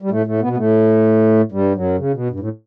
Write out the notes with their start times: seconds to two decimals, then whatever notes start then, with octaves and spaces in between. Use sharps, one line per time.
0.02 G3
0.10 A2 A3
0.26 A2 A3
0.41 B2 B3
0.53 B3
0.57 A2 A3
1.52 G2 G3
1.75 F#2 F#3
1.98 C#3
2.14 B2
2.30 G2
2.40 A2